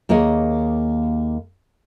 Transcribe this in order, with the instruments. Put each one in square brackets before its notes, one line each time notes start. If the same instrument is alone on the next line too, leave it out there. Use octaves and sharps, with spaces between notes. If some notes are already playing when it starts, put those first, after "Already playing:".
[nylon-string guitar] D#2 A#3 G#4 C#5 D#5